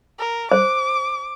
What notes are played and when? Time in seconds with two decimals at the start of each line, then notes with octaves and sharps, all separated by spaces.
0.19 A#4
0.52 C5 D6